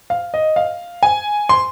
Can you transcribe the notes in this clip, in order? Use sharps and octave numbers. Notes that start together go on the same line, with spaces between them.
F5
D#5
F5
G#5
C6